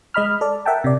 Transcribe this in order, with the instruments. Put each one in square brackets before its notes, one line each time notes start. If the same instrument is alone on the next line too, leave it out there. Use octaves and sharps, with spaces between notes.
[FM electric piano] G#3 D#5 B5 F6
A4 D5
A#4 E5 F#5 G5 A5
C3 D5